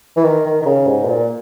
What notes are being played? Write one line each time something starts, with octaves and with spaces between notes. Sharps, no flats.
E3
D#3
D#3
D#3
C#3
G#2
B2
A#2